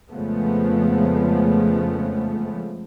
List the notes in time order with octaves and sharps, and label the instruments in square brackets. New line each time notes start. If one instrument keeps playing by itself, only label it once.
[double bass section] F2 C#3 F3 G#3 A3 B3